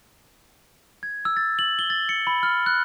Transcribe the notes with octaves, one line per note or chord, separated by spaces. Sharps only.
G#6
E6
A6
F#7
G7
A6
C#7
B5
F6
F#6